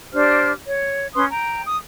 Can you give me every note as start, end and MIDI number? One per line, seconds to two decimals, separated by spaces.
0.13 0.52 62
0.13 0.52 67
0.13 0.52 72
0.13 0.52 89
0.67 1.09 73
1.15 1.25 61
1.15 1.25 71
1.15 1.25 84
1.15 1.25 87
1.30 1.62 79
1.30 1.62 82
1.66 1.79 87